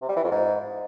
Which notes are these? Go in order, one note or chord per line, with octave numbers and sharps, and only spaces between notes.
C3
G3
E3
F2
G#2